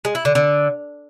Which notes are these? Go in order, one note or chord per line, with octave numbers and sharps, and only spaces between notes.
G#3
E4
D3
D3